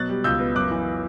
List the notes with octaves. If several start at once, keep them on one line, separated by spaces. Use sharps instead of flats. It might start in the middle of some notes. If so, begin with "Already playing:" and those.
Already playing: B2 F#3 F#6 A6
G3
C#2 E6 G6
B3
F#2 D6 F#6
E3